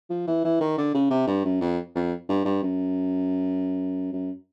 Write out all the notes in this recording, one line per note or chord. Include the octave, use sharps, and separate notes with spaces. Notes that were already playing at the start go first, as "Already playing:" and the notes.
F3
E3
E3
D#3
D3
C#3
C3
G2
F#2
F2
F2
G2
G2
F#2
F#2